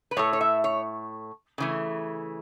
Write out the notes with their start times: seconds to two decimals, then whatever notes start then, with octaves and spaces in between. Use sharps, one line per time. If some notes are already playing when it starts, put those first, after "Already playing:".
0.11 B4
0.17 A2 A3 C#5
0.33 C#5
0.41 E5
0.64 C#5
1.58 C#3 E3 A3